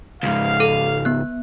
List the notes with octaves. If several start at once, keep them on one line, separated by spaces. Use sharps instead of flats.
C#2 G#2 F5
A4
B3 F#6